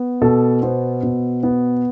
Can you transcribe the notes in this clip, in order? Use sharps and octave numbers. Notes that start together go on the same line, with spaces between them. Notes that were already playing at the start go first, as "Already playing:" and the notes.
Already playing: B3
B2 A4
B3 C5
B2
B3